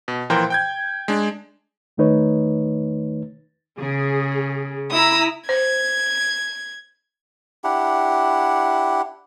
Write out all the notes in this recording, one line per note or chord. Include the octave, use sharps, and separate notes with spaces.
B2
A#2 E3 F3 A#4 C5 G5
G5 G6 G#6
G#3 D4
E2 D#3 A3 D#4 B4 C#5
C#3 G#4
E4 A#5 D#6 E6
C5 G#6
D4 E4 G4 F#5